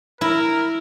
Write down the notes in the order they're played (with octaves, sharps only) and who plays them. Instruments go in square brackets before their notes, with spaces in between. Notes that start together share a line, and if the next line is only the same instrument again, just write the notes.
[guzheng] E4 [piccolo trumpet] A#4